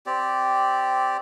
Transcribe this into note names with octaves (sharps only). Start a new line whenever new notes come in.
C4 G4 D5